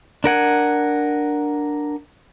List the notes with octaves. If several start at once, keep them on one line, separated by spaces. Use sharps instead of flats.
D4 A#4 F#5 G#5